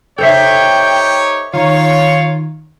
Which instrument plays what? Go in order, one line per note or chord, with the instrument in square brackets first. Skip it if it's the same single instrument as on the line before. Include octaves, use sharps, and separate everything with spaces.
[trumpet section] D#4 G4 C#5 [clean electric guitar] A4 C5 E5 [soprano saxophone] G5
[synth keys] D#3 [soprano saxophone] F4 [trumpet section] C#5